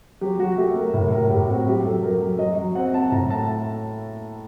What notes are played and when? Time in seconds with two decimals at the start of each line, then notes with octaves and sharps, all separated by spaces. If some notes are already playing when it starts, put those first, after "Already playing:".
0.21 F#3 G4
0.40 F#3 F#4
0.58 A3 G4
0.76 A3 A#4
0.93 A2 A#4
1.12 A2 A#4
1.30 A2 G4
1.48 C4 F#4
1.67 F#2 G4
1.85 F#2 A4
2.02 F#2 A#4
2.22 F#2
2.39 F#3 D#5
2.57 F#3
2.75 C4 F#5
2.94 C4 A5
3.11 A2 A#5
3.30 A3 A5